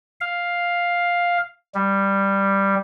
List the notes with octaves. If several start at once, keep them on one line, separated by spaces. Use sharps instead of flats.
F5
G3